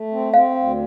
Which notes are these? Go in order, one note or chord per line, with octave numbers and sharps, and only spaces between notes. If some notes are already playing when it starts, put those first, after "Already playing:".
Already playing: A3
C4
C4 F5
D2